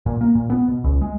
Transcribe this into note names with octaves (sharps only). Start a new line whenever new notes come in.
A#2
A#3
A#2
B3
B2
C#2
G#3